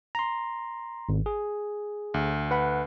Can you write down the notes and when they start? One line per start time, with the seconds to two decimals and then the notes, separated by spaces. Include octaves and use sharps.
0.15 A#5 C6
1.09 G#1
1.26 G#4
2.14 D2
2.51 B4 F#5 B5